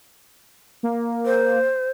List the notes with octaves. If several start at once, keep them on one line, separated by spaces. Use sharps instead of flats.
A#3
C5